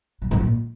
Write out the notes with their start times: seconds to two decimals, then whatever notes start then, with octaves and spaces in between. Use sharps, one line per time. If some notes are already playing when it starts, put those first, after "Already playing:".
0.22 B2
0.31 G#2
0.40 A#2